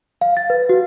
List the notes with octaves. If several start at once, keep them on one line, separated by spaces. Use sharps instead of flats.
F5
A6
B4
F#4